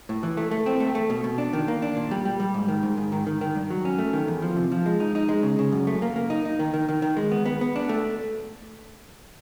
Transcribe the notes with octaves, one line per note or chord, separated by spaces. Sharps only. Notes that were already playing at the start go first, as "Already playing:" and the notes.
A2
E3
A3
A3
C4
A3
A3
B2
B2
D4
D#3
A#3
D4
A#2
G3
G3
G3
G#2
D#3
G#2
G#2
D#3
D#3
D#3
G2
F#3
C#4
A3
D#3
E2
F3
C3
F3
G#3
D#4
D#4
G#3
C#3
C#3
F#2
A3
A#3
A#3
D#4
D#4
D#3
D#3
D#3
D#3
G#3
B3
B3
B3
D4
A3